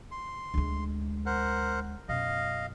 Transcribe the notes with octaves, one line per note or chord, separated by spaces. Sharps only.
C6
D2 G#3
A#4 C5 F#5
F#2 B2 D#5 F5